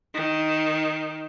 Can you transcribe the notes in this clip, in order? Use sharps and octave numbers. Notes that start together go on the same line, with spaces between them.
D#3